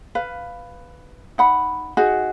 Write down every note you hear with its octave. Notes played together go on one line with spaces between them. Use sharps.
B4 F5
D#4 F#5 B5
D#4 F#4 G#4